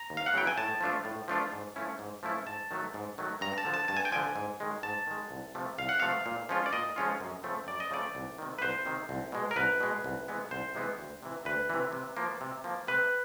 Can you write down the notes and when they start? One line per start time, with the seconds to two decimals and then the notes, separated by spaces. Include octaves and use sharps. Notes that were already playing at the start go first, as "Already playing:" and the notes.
Already playing: A#5
0.10 D#2
0.17 F5
0.26 F#5
0.34 C#3 F#3 B3 E4 G5
0.47 G#5
0.58 A2 A5
0.81 F3 A3 D4 F4
1.05 A2
1.28 F3 A3 D4 F4
1.53 G#2
1.76 F3 A3 C#4 E4
1.99 G#2
2.23 F3 A3 C#4 E4
2.46 G#2 A5
2.71 D#3 F#3 A3
2.94 G#2
3.18 D#3 F#3 A3
3.41 G2 A#5
3.58 A5
3.65 D3 F3
3.74 A5
3.88 G2 A5
3.97 G#5
4.05 G5
4.12 D3 F3 G#5
4.36 G#2
4.60 D#3 G#3
4.83 G#2 A5
5.07 D#3 G#3
5.31 C2
5.55 C3 F3 A3
5.78 C2 F5
5.89 F#5
6.00 C3 F3 A3 F5
6.26 A#2
6.49 F3 G#3 C#4 F4
6.66 D5
6.73 A#2 D#5
6.96 F3 G#3 C#4 F4
7.21 F#2
7.43 C#3 F3 A3 C4
7.67 F#2 D5
7.80 D#5
7.91 C#3 F3 A3 C4 D5
8.15 C2
8.39 C3 D#3
8.58 B4
8.62 C2 C5
8.86 C3 D#3
9.09 C2
9.32 B2 G#3
9.51 A#4
9.56 C2 B4
9.81 B2 G#3
10.04 C2
10.28 C3 E3 G#3 B3
10.51 C2 C5
10.75 C3 E3 G#3 B3
10.98 D2
11.23 C3 E3
11.45 D2 B4
11.70 C3 E3
11.93 C3
12.17 F3 A#3
12.41 C3
12.64 F3 A#3
12.87 C3 B4